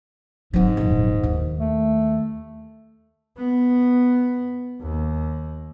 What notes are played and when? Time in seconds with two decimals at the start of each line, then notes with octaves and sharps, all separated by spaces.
0.53 G#2 F#3 C4
0.77 D#1 F2
1.23 D#2
1.60 A3
3.37 B3
4.81 D#2